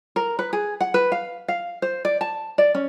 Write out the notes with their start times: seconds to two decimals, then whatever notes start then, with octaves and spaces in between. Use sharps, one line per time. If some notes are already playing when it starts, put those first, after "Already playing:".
0.16 A#4
0.39 B4
0.53 G#4
0.81 F#5
0.94 B4
1.12 F5
1.48 F5
1.82 C5
2.05 D5
2.21 A5
2.58 D5
2.75 C#4